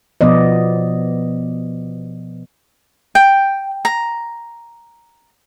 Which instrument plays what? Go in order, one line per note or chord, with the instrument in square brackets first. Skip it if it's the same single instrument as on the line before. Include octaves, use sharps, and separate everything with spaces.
[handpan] B2 F3 B3 D5 D#5
[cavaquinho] G5
A#5